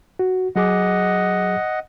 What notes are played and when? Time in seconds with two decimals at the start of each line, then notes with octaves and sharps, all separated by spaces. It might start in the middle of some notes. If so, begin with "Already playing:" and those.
0.19 F#4
0.56 F#3 G#4 D#5 F#5 D6